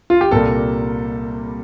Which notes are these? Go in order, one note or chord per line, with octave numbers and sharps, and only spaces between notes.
F4
G4
C2 A#2 G3 A#3 A4